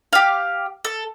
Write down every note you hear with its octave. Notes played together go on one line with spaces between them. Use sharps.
G4 F5
A4